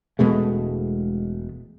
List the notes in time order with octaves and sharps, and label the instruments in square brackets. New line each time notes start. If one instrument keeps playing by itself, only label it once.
[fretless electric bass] E1 B2 G#3 A3